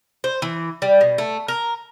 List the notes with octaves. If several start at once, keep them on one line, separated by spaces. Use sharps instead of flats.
C5
E3
G3
B2
A3
A#4